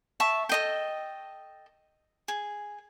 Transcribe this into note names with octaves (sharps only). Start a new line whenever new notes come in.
E5 A5 C#6
A4 D#5 G5
G#4